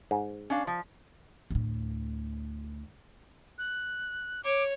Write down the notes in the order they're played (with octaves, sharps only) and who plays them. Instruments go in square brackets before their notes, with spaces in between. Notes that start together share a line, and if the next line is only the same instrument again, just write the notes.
[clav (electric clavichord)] G#2
[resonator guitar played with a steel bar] C#4 D4 F5
F3
[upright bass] D2 A2
[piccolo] F#6
[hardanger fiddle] C#5 [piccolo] D6